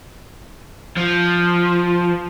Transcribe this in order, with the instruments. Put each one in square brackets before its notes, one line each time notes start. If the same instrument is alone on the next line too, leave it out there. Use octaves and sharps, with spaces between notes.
[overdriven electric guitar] F3